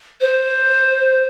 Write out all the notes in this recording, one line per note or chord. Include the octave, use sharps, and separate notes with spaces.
C5